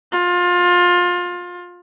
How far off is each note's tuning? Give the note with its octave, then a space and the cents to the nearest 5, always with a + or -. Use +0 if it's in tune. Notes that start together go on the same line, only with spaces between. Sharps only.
F4 +25